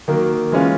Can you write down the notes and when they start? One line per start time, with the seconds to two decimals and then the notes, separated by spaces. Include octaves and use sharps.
0.08 D#3 F#3 A#3
0.52 E3 G#3 C#4 F4